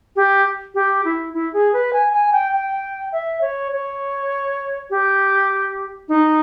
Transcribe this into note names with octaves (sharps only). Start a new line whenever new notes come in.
G4
G4
E4
E4
G#4
B4
G#5
G#5
G5
G5
E5
C#5
C#5
G4
D#4